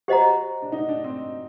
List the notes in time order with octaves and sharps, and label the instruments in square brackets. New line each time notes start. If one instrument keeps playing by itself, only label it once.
[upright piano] F#4 [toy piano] G4 C5 D#5 F#5 A#5
[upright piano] D4
D#4
D4
C4